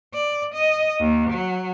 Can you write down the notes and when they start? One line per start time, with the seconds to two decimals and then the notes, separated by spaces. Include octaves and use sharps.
0.14 D5
0.54 D#5
1.00 D#2
1.30 F#3